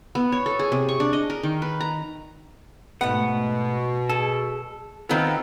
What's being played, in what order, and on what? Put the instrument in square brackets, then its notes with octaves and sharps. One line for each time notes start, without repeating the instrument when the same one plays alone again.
[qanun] B3
C#5
A4
G#4
C3
C#6
D4
D#5
A#4
D#3
B4
A#5
[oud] G#2 A3 [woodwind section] B2 [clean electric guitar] B3 [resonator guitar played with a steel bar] F#5
[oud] G#4 [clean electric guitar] A4
[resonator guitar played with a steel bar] D#3 F4 [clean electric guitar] B3 C4 [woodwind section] A4